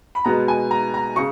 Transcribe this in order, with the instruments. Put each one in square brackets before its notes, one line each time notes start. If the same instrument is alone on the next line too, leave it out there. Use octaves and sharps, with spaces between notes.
[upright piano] B5
B2 G#3 B3 A#5
G#5
A#5
A#5
C#3 C#6